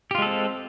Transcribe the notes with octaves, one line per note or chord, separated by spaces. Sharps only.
G#3 C4 F4 G4 A4